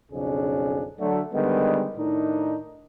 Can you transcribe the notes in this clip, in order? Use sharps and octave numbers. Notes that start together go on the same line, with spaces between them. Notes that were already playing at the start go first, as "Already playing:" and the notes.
B1 F2 C#3 C#4 D4 G#4
D3 F#3 A3
D3 D#3 G3 G#3 B3
A2 D#3 D4 D#4